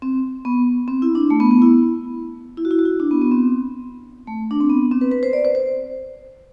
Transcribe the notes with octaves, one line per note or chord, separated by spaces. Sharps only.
C4
B3
C4
E4
D4
A3
B3
B3
E4
E4
F#4
E4
F#4
E4
D4
B3
B3
C4
A3
D4
C4
B3
C4
B4
B4
C5
D5
C5
C5